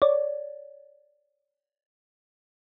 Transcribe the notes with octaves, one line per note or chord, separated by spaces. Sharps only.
C#5 D5